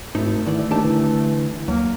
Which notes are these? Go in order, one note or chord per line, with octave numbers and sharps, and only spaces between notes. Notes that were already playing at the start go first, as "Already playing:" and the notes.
G#1 G#2 A3 D#4 E4
D2 D#3 E3 A3 D5
D#2 D4 G4 A5
D3 E3
D2 F#3 A#3